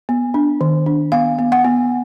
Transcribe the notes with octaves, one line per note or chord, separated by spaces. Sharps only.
B3
D4
D#3
D4
B3 F5
B3
F#5
B3